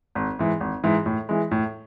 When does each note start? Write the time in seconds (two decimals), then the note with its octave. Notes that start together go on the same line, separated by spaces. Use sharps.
0.15 G#1
0.39 G#2 E3
0.60 G#1
0.84 G#2 E3
1.06 A2
1.29 E3 G#3
1.51 A2